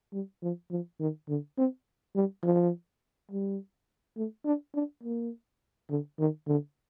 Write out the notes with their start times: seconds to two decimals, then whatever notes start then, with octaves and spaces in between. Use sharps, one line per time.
0.13 G3
0.43 F3
0.70 F3
1.00 D#3
1.29 D3
1.58 C4
2.15 G3
2.43 F3
3.31 G3
4.17 A3
4.45 D4
4.75 D4
5.03 A#3
5.90 D3
6.19 D#3
6.48 D3